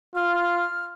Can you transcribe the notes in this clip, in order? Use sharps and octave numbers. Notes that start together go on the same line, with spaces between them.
F4 F6